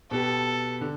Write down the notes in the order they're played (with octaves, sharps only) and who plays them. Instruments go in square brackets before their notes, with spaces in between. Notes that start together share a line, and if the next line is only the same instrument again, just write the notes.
[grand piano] B2 B3 G4 [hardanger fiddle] A4
[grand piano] D3